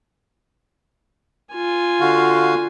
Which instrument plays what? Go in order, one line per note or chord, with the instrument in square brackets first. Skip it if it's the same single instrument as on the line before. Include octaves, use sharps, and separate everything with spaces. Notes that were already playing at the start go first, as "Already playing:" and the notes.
[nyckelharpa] F4 G#5
[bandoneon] D3 F#4 F5